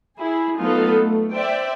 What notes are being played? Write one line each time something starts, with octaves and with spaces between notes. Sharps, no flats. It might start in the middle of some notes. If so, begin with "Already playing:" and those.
E4 G#4
F#3 A3 B3 D#4 F4 A4
A3
C5 D5 E5 G5